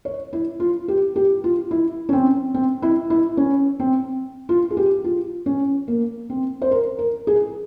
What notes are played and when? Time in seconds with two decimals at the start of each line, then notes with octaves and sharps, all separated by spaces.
0.05 C#5
0.33 E4
0.60 F4
0.88 G4
1.16 G4
1.44 F4
1.71 E4
2.09 C#4
2.13 C4
2.54 C4
2.82 E4
3.10 E4
3.37 C#4
3.80 C4
4.49 F4
4.70 G#4
4.77 G4
5.04 F4
5.46 C#4
5.88 A#3
6.30 C4
6.62 C5
6.71 A#4
6.99 A#4
7.27 G#4